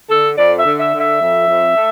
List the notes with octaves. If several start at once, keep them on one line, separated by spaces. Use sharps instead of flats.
D3 A4
F2 D5
E5
D3
E5
D3
E5
F2
F2
A3